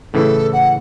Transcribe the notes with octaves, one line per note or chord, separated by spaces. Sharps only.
A2 C#3 E3 A4
F#5